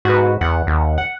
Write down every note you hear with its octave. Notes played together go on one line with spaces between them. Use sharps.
G#2 F#4 B4
E2 F#5
D#2
F#5